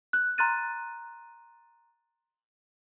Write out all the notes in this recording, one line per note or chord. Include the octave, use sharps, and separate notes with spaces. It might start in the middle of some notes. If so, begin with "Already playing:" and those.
F#6
A#5 C6 F6 F#6 A6 D#7